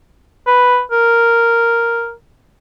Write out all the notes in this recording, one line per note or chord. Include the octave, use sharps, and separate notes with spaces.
B4
A#4